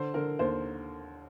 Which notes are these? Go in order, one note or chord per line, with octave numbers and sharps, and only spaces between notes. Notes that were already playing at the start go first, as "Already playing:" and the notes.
Already playing: D3 C5
D3 A#4
D#2 C5